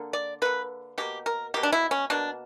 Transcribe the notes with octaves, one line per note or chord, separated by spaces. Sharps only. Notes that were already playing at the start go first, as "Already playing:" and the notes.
Already playing: D3 A#3
D5
D3 A#3 B4
B2 A#3 G4
A#4
B2 A#3 G4
D4
E4
C#4
B2 A#3 D4